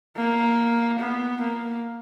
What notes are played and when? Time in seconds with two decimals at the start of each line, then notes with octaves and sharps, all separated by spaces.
0.17 A#3
0.99 B3
1.41 A#3